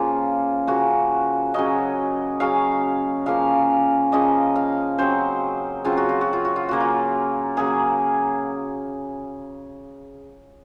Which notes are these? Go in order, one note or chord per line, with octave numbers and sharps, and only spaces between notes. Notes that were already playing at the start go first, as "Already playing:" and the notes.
Already playing: C#3 F3 A#3 F4
C#3 F3 A#3 F#4
C#3 F#3 C#4 D#5
C#3 F#3 C#4 F5
C#3 F3 A#3 F5
C#3 F3 A#3 D#5
F5
C#3 F#3 C4 C5
C#3 F#3 C4 F4
F#4
F4
F#4
F4
F#4
F4
C#3 F#3 A#3 F#4
F4
C#3 F#3 A#3 G#4